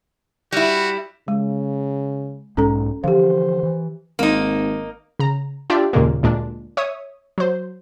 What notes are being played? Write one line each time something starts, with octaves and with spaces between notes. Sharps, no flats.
G3 E4 F#4
C#3 G#3
B1 G#2 G#3 C#4 A4 A#5
D3 E3 F3 G4 C5 F5
E3
G#1 A#3 D#4
C#3 A#5
D4 F4 G4 D5 E5
D#2 A#2 C#3 G#3 A#3
D2 A#2 G#3 D4
C#5 E5 D#6
F#3 C5